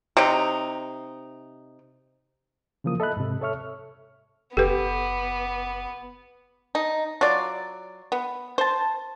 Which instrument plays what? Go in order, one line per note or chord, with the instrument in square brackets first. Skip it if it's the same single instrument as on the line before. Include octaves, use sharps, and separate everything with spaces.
[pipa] C3 D#4
[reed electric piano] C#3 E3 F3 A#3 D#6
A4 D#5 E5 B5 F#6
G#2 C3
A4 C#5 E5 C#6 F6
[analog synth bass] F#1 [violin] B3 [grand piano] G4 [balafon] A4 B4
[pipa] D#4
F#3 F4 D5
B3
C5 A5